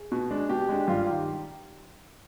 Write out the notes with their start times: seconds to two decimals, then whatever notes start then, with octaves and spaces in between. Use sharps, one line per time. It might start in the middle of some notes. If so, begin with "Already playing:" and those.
Already playing: G#4
0.12 B2
0.31 G#3 D4
0.49 B2 G4
0.69 G#3 D4
0.88 G2 F4
1.06 D#3 G4